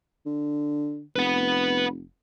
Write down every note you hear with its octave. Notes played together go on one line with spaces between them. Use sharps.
D3
F1 B4 F#5